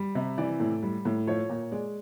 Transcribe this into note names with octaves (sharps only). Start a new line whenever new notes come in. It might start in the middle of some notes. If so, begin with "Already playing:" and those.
Already playing: G3
C3
E3 D5
A2
G3
A2
F3 C#5
A#2
G#3 D5